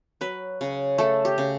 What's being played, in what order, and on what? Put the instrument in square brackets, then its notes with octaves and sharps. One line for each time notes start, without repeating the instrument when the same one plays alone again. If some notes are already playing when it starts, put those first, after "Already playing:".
[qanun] F#3 B4
C#3
A3 A4
G4
C#3